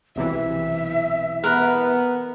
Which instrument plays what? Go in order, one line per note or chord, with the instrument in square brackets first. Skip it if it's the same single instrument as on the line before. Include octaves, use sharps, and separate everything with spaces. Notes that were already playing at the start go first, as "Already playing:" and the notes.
[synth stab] B1 C3 E3 [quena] E5
[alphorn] B3 [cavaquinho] A#4 B4